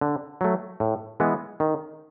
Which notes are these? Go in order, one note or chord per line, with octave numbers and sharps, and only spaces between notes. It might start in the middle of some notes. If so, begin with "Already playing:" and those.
D3
F#3 A3
A2
E3 G#3 B3
D#3